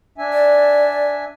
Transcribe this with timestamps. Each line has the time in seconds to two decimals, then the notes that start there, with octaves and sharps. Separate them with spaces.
0.18 D4 E5 G#5
0.33 D5